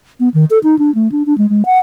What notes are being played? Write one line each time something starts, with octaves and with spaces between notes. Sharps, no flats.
B3
D#3
A4
D#4
D4
A3
D4
D4
G#3
G#3
F#5